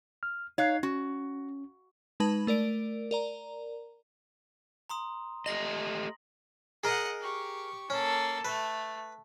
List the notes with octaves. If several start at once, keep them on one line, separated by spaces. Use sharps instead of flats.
F6
D#4 C#5 F5 F#6 C7
C#4 F#4
G#3 D#4 B4 A5 B5 F#7
A3 A#4 D5 D7
A#4 D5 A#5
A#5 C6 D#6
A3 G4 D#5 A#6 F#7
G#4 A#4 D#5 F#5
G4 C#6
A#3 C#4 A4
A3 B4